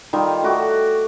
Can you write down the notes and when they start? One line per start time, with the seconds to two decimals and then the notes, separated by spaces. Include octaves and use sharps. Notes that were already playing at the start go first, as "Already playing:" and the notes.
0.13 D#3 G3 D#4 F4
0.43 A3 F#4 D6